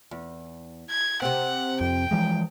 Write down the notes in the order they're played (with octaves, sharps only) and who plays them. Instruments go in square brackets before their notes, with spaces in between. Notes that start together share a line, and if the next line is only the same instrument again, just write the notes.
[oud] E2
[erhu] G#6
[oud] C3 C4 [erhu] F#5
[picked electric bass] F2 [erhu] G5
[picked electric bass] E3 F3 G#3